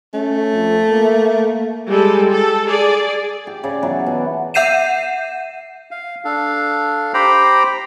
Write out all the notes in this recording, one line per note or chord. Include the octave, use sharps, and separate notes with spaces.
A3 C#4
F2
A#3
G3 G#3 A4
A4
G#4 D5
G4
C#3 C#5 D5
E3 F#3 B3
B2
E5 F#5 G6 C7 D#7 E7
F5
D4 A4 F5
G4 C5 G5 A#5 B5